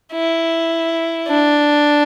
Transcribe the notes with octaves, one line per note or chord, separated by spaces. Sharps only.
E4
D4